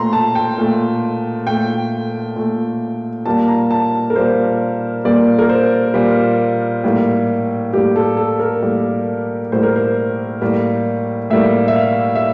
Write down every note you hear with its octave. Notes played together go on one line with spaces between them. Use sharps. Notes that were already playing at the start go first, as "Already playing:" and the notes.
Already playing: A#2 A3 A#5 C6
A5
G5
A#2 A3
A#2 A3 G5
A#2 A3
A#2 G3 A#3 A5
A#5
A5
A#4
A#2 G3 A#3 C5
A#2 G3 A#3 D5
A#4
C5
A#2 G3 A#3
A2 G3 A#3
A2 G3 A#3 G4
A4
A4
A#4
A2 G3 A#3
A2 G3 A#3 C5
A#4
C5
A2 G3 A#3
A2 G3 A#3 E5
E5
F5
E5